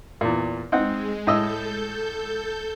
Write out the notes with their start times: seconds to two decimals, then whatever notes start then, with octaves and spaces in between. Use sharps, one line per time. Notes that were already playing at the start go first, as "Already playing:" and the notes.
0.21 E2 A#2
0.72 G#3 C4 D#4 F#5
1.27 A2 A4 D#5 E6 G6